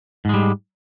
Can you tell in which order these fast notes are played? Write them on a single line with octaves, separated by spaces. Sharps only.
G#2 G#3 G3